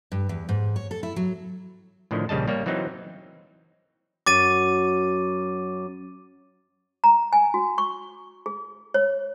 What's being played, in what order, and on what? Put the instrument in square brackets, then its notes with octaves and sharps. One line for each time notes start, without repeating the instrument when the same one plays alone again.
[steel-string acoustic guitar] G2
E2
G#2
C#5
A4
E4
F#3
[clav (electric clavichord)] A2 D3 D#3 F3
A#1 C#3 G3 D#5 A5
G3 A#3 C#5
E3 F#3 C4 D#4
[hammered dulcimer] F#2 [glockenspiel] D6 A6 D#7
[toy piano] A#5
G#5
F#4
C#6
G#4
C#5